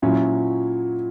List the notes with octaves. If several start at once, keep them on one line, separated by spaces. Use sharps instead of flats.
A#2 F#3 C#4 E4